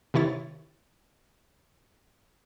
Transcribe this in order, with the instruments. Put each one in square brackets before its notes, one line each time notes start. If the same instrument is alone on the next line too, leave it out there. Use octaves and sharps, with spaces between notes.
[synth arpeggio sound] C3 D#3 E4 C#5 A6